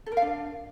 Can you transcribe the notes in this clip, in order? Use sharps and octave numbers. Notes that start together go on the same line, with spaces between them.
A4
A#4
F5
D4